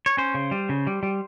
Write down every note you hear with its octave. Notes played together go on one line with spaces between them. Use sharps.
C#5
C#4 C5
C#3
G3
C#3
G3
G3